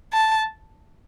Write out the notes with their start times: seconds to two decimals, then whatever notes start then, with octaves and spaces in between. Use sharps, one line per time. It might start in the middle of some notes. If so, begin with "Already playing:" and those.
0.13 A5